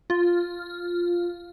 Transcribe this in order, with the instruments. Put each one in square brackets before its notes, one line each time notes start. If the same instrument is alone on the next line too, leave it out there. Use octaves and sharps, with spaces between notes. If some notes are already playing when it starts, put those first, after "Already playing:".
[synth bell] F4